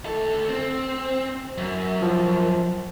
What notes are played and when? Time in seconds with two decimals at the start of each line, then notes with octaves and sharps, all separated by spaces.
0.06 D2 A4
0.49 C4
1.58 F#2
2.02 F3